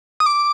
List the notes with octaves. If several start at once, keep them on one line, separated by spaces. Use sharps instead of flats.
D#6
D6